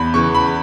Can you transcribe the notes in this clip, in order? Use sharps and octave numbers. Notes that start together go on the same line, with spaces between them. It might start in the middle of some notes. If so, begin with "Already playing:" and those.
Already playing: E2 B5
C#3 E3 C#6
B5